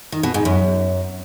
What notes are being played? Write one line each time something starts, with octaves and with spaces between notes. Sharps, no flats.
D#3
B2
G#2
F#2